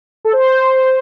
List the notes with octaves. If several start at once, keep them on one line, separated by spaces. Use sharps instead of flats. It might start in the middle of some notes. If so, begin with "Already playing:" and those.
A4
C5